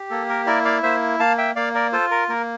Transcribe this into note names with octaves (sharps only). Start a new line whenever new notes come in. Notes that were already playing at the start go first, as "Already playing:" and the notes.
Already playing: G4
A#3 A4
A#4
E4 A#4 D5
D5 F5
A#3 C5 E5
A#3 F5 A5
E5 G5
A#3 D5 F5
A#4 D5
F4 A4 C5
A#4
A#3 A#4